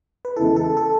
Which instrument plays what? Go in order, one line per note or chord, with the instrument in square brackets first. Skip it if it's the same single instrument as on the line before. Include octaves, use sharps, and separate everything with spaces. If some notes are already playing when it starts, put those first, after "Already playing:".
[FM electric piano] B4
[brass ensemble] E2 C#3 G#3 B3 E4 [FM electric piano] A4
[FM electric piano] A4
A4